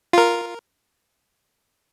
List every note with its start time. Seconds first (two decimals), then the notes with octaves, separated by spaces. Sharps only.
0.13 F4 A#4